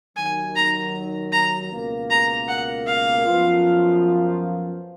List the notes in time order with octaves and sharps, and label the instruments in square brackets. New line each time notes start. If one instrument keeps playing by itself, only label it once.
[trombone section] D#2 D#3 F#3 [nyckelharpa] G#5
[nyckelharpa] A#5
A#5
[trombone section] C#2 B2 A#3
[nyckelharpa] A#5
F#5
F5
[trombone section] F#2 F3 B3 F4